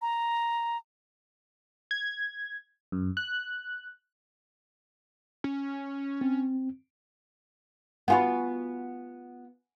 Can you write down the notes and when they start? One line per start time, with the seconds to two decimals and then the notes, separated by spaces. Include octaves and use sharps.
0.02 A#5
1.91 G#6
2.92 F#2
3.17 F#6
5.44 C#4
6.21 C4
8.08 B3 F4 F#4 F#5 G#5 B5